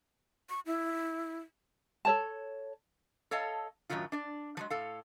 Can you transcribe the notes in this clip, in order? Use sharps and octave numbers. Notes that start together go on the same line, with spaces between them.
C#6
E4
A4 C#5 A5
A4 C#5 D#5 F5 A5
F#2 A2 C3 D#3 F#3 F4
D4 D5
F3 F#3 G#3
A2 A4 F5